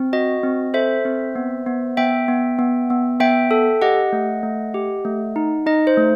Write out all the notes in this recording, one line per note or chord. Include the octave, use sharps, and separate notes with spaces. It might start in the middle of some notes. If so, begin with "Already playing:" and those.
Already playing: C4
F#4 D#5
C4
A4 C5 E5
C4
B3
B3
B3 E5 G5
B3
B3
B3
B3 E5 G5
A4
G4 D#5 F#5
A3
A3
G4
A3
D#4
D#4 D#5
C5
A3